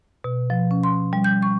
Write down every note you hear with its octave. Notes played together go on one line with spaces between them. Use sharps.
B2
F3
C#4
C6
G3
G6
C#6